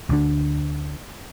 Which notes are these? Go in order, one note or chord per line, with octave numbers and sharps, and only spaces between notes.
D2 D3 D4